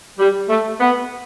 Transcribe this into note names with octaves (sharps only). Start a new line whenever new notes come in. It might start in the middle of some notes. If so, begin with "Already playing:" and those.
G3
A3
B3